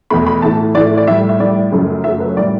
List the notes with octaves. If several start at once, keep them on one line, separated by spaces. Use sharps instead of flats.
E2 B2 A3 B5
B5
A2 E3 A3 A5
A2 E3 A3 D5
D5
A2 G3 E5
E5
A2 G3 D5
F#2 C#3 F#3 A3
F#2 C#3 F#3 A3 E5
B4
C#5
A2 G3 D5